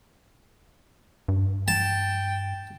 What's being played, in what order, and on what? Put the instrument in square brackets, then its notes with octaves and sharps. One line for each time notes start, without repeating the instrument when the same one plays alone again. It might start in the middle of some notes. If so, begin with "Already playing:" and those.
[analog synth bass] G2
[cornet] G5 [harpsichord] A5